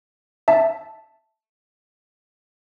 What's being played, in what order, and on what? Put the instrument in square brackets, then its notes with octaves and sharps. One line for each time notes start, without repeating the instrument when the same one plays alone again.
[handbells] E5 A5